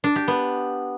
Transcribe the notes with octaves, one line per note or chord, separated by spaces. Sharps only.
D4
G4
B3